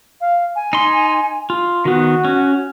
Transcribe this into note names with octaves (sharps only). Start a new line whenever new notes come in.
F5
G#5
D#4 C6
F4
D#3 B3 F#4
C#4